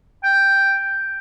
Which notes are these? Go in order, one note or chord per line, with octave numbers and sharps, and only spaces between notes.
G5